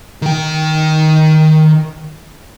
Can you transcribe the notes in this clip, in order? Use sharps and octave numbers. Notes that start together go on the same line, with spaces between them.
D#3 G5